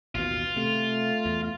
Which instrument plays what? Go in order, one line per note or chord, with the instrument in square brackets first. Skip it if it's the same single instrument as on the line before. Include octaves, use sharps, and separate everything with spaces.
[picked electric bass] A1 D#2 B2 [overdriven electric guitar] F4
[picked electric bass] C3 [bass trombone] A3
[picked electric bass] E2